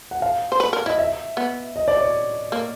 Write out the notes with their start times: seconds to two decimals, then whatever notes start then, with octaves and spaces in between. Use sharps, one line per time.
0.11 F#5
0.22 F5
0.52 C5
0.60 B4
0.73 A#4
0.86 E4 D#5
0.98 E5
1.37 B3
1.76 D#5
1.88 D5
2.01 C#5
2.52 A#3